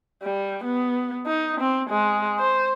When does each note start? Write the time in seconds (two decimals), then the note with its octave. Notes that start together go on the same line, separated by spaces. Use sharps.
0.22 G3
0.64 B3
1.27 D#4
1.60 C4
1.90 G#3
2.39 C5